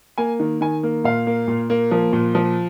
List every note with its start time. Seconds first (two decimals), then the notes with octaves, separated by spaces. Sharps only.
0.18 A#3 G#5
0.40 D#3
0.61 D#3 G#5
0.83 A#3
1.04 A#2 F5
1.27 A#3
1.48 A#2
1.70 A#3
1.91 F3
2.13 A#2
2.35 F3